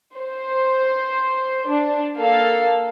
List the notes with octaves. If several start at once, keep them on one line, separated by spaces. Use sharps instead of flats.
C5
D4
A#3 A4 F5